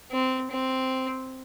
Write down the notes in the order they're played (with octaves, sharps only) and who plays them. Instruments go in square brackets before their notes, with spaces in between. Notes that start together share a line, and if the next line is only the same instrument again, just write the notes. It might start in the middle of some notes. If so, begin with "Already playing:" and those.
[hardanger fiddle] C4
C4